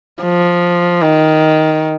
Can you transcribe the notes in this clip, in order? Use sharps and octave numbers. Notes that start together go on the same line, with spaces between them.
F3
D#3